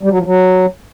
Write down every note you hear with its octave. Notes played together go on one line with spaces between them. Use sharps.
G3
F#3
F3
F#3